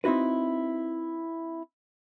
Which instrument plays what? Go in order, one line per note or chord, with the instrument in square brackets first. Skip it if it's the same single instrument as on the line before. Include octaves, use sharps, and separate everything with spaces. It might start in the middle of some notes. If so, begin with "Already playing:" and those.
[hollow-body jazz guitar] C4 D#4 E4 F#4 B4